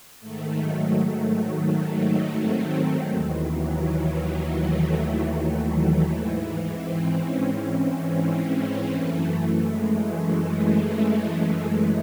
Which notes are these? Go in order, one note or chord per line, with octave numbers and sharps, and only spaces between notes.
G#2 D#3 A3
F#3
F#3
C4
D#2 D#3 E3
F#3
A3
G#2 E3
C4
C#4
C4
F#2 E3 A3
G#3
A3
A3
A3